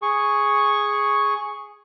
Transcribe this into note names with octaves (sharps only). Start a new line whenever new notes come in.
G#4 C#6